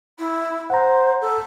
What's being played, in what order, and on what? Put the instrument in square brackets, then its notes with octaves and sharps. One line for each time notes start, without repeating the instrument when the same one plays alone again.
[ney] E4
[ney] C5 [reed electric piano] F#5 A#5
[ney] A4